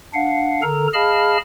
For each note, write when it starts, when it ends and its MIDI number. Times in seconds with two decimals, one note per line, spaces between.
0.14 0.62 62
0.14 0.62 77
0.14 0.62 78
0.62 0.87 50
0.62 0.87 69
0.62 0.87 70
0.62 0.87 82
0.94 1.37 68
0.94 1.37 75
0.94 1.37 77
0.94 1.37 81
0.94 1.37 83
0.94 1.37 89